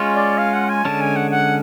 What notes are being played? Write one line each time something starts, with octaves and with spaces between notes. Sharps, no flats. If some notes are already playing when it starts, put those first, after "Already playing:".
Already playing: G#3 C#4 F4
D5
F5
F#5
G#5
D3 G#3 C#4 A5
G#5
F#5
F#5